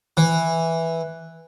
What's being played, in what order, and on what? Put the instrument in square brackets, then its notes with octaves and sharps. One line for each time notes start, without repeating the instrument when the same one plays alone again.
[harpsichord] E3